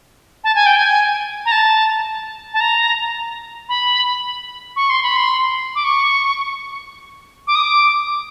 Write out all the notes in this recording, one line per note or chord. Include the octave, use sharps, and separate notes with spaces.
A5
G#5
G5
G#5
A#5
A5
A5
A#5
B5
C#6
C6
B5
C6
D6
C#6
D6
D#6
D6